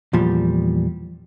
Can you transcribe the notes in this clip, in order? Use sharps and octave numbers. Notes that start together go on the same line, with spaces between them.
E2 A#2 F3 G3